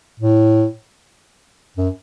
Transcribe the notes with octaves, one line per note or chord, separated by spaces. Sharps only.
A2
F#2